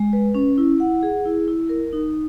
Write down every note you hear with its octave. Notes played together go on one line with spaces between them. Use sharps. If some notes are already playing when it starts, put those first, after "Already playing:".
Already playing: G#3
B4
C#4
E4
F#5
G#4
E4
E4
A#4
D#4